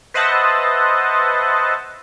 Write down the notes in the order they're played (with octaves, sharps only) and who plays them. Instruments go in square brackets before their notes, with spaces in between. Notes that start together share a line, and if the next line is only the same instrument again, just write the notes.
[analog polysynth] B4 C5 D#5 E5 F#5 A5